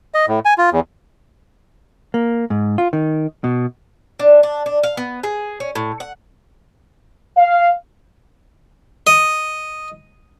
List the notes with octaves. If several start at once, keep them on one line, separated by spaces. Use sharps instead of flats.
D#5
A2
G#5
F4
E2
A#3
G#2
F4
D#3
B2
D4
D4
D4
F5
B3
G#4
C#4
A2
F#5
F5
D#5